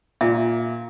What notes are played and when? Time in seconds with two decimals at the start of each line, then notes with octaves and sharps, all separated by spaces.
0.21 A#2 E5